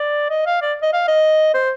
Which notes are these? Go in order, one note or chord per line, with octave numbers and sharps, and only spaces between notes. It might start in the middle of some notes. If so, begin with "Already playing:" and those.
Already playing: D5
D#5
F5
D5
D#5
F5
D#5
C5